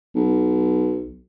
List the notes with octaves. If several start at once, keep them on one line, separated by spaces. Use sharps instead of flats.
B1